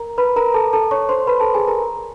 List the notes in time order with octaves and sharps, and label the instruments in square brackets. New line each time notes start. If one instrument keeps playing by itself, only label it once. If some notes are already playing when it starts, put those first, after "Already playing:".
Already playing: [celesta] A#4 A#5
B4 B5
A#4 A#5
A4 A5
A4 A5
C#5 C#6
C5 C6
B4 B5
A4 A5
G#4 G#5
A#4 A#5